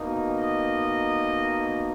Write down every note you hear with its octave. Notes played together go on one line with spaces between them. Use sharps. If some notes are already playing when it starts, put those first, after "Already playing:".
Already playing: B2 A#3 D#4
D#5